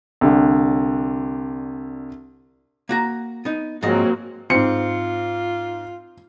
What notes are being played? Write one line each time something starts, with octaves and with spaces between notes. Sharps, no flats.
C2 D3
A#3 F#4 A#5
B3 D#4
G#2 F3 F#3 A#3 C4 D#5
G#2 C4 F4 C#7